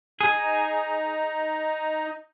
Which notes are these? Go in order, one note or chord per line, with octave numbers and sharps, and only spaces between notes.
D#4 G#4